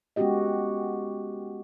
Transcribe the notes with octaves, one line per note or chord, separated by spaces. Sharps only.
G#3 B3 C#4 F#4 G4 D#5